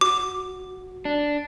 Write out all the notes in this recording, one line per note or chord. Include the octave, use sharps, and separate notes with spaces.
F#4 D6
D4